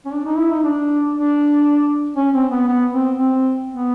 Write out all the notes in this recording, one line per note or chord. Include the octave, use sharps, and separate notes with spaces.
C#4
D4
D#4
E4
D#4
D4
D4
C#4
C4
B3
B3
C4
C4
B3